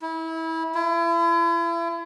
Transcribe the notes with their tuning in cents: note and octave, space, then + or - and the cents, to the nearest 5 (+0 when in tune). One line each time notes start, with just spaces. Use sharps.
E4 -25
E4 +40